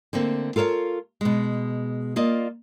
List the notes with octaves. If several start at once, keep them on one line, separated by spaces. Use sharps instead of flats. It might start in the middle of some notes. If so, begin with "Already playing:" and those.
D3 A3 A#3 C4
F4 A4 A#4 C#5 F5
B2 G#3
A#3 F4 D5 D#5